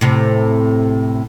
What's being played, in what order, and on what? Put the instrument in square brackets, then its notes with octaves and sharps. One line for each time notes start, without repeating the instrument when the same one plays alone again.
[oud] A2 C3